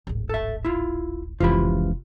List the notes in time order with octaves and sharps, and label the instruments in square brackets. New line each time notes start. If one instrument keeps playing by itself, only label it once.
[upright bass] D1 G#1
[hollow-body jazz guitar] A4 E5
E4 F4
[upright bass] F1 C4 [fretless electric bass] C#2 E3 F3 [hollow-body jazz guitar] F4 G4 B5